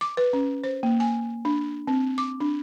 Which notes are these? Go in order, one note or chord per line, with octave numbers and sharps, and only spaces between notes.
D6
B4
C#4
C5
A#3
G#5
D4
C4
D6
D4